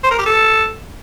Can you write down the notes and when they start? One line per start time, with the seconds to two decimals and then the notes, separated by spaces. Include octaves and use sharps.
0.04 C5
0.11 A#4
0.19 G4
0.26 A4